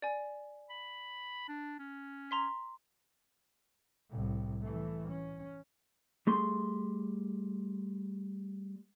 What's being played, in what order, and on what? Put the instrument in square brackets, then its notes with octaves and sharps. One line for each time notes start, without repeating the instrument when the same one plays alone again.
[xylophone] D5 G#5
[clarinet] B5
D4
C#4
[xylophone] A#5 C6 B6
[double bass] C2 A2
E3 A3
C#4
[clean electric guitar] G3 A3 G#4 C6